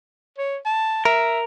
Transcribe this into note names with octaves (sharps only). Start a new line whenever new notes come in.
C#5
A5
A#4 E5